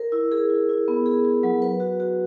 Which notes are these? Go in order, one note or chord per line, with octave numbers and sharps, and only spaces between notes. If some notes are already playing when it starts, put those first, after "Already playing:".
Already playing: A#4
E4
G#4
E4
E4
B3
G#4
G#4
F#3
B4
F#4
F#4